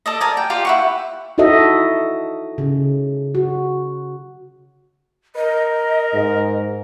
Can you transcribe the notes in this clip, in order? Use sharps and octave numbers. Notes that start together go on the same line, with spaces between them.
A4 D5 D#5
A#4 D5 G#5
G5
F4 G4 D5 G5
E4 F#5 C#6
D#4 E4 F#4 A4 D#5 E5
C#3
F#4
A#4 D#5
G#2